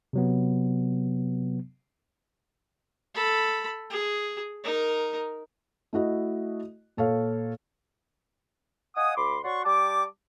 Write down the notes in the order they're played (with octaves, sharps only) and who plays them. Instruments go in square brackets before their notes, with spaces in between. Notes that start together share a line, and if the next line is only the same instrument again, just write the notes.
[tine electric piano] C3 F#3 B3
[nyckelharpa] A4 B5
G#4
D#4 A#4
[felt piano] A3 E4 F#4 D#5
A#2 A4 C#5 F5
[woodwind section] D#5 F5 F#5 G#5 D#6
D2 B5 C6 D6
F#4 C#5 D5 F#5 C6 C#6
G3 G5 A5 D6